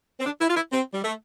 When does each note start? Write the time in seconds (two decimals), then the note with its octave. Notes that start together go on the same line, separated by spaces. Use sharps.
0.20 C4
0.26 D4
0.41 E4
0.50 F4
0.57 E4
0.73 C4
0.94 G3
1.04 A3